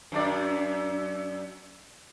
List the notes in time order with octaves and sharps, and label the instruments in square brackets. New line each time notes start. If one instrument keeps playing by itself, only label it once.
[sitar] F#2 D4 D5